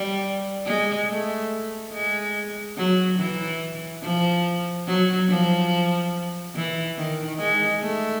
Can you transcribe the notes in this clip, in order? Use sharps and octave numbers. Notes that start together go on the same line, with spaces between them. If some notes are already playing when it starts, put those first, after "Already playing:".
Already playing: G3
G#3
A3
G#3
F#3
E3
F3
F#3
F3
E3
D#3
G#3
A3